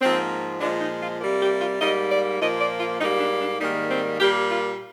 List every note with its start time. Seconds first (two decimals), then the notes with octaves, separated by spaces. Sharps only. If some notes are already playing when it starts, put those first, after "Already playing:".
0.01 G#2 F3 A#3 C4
0.61 A#2 F3 G#3 D4
0.81 D#4
1.00 F4
1.20 C3 G3 A#3
1.41 G4
1.61 F4
1.80 G#2 G3 A#3 D#5
2.11 D5
2.40 A#2 F3 A#3 D#5
2.60 D5
2.80 F4
3.00 G#2 G3 A#3 D#4
3.20 D4
3.40 D4
3.60 G#2 D#3 G3 A#3 D#4
3.90 C4
4.20 A#2 G3 A#3 G4
4.50 F4